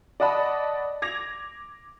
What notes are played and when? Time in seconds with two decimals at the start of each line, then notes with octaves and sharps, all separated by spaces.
0.20 D5 D#5 F#5 A5 B5
1.02 D6 G#6 A#6 F7